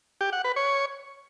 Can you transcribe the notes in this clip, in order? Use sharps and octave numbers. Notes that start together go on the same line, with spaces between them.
G4
F#5
B4
C#5